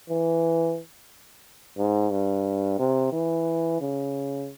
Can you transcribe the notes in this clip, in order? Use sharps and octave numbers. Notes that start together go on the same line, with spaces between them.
E3
G#2
G2
C3
E3
C#3